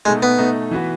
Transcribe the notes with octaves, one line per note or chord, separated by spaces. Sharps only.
B2 G#3 A3 D#4
B3
B2 A3 D#4
E3 B3 F#4 B4